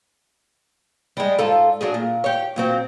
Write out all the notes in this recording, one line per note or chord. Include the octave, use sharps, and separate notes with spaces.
G3 G#3
G#2 F4 A4
F#3 D4 G#4
A#2
G4 C#5
A#2 F#3 C4